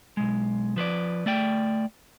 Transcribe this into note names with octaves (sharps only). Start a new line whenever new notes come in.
B1 G#3
F3 B4 C5 D5
A3 D5 G5